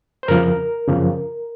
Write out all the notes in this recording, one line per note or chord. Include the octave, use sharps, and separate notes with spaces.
C5
F2 C#3 F3 A#4
F#2 C#3 F3